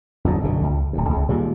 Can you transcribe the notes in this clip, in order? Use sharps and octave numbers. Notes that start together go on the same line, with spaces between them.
G1 E2 G#2 F#3
F#1 B1 B2 D3
C#2
D1 D2
C#2 C#3
A#2 D#3 G3 G#3